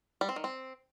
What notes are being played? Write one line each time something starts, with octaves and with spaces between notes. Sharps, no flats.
G3
C4
D#3
C4